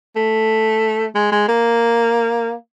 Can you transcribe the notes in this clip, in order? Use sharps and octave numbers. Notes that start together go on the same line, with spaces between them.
A3
G#3
G#3
A#3